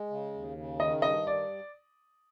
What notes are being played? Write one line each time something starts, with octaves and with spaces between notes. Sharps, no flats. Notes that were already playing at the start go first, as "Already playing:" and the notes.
Already playing: G#3
C#3
D#2
C#3
D#3 D#5
G2 D#5
D#3 D5